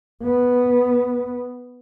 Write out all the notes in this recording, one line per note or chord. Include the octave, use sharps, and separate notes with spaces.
B3